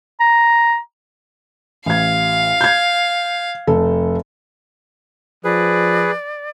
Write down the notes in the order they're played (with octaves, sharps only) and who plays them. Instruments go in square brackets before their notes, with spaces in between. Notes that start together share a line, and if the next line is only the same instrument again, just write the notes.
[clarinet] A#5
[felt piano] A1 G#6 [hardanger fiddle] F5
[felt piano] G6 G#6
F1 A4
[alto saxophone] F3 [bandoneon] G#4 B4 [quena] D5